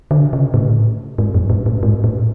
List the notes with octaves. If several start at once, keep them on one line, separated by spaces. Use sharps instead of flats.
D3
C#3
A2
G#2
F#2
A2
A2
G#2
A2